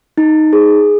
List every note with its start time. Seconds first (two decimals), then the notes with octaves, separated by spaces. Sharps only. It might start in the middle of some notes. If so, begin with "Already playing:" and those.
0.18 D#4
0.53 G#4